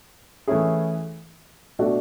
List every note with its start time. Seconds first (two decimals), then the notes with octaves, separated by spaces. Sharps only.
0.48 E3 A3 C#4 E4 G#4
1.79 B2 A3 D4 F#4